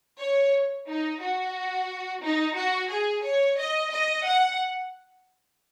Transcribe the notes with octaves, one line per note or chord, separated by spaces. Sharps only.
C#5
D#4
F#4
D#4
F#4
G#4
C#5
D#5
D#5
F#5